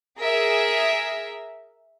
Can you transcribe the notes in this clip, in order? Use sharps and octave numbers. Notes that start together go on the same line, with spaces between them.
G#4 A#4 E5